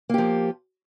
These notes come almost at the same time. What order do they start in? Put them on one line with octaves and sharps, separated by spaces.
A#3 G4 F3